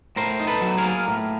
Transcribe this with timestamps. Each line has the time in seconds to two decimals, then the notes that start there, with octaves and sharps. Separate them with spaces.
0.16 A2 A#4 C5
0.40 D#4
0.47 A4 B4
0.62 F#3
0.77 G#4 A#4
0.84 A#3
1.08 A2